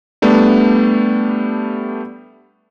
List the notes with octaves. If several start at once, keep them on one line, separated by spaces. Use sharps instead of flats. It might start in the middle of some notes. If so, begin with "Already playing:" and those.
G3 A3 B3 D4